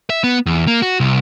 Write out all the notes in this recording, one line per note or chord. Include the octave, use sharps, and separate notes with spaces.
E5
B3
E2
A#3
F#4
C2